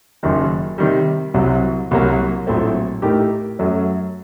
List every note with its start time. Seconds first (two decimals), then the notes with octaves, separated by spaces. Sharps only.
0.23 F#1 F#2 D#3
0.78 C3 D#3 G3
1.34 C2 C3 F#3
1.91 C2 C3 F#3 A#3 F#4
2.47 A#1 A2 F#3 A3 C4
3.02 A2 A3 D#4 G4 A#4
3.59 F#2 F#3 A3